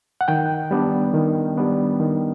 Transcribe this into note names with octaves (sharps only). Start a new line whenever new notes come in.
F#5
D#3 G5
G3 B3 D4
D#3
G3 B3 D4
D#3